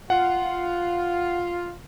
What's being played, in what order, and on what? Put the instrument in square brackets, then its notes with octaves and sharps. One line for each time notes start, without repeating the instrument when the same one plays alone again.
[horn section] F4 [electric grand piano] F#5